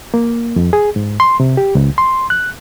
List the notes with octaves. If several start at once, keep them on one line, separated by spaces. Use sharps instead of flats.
A#3
F2
G#4
G#2
C6
C3
G4
C#2
C6
F#6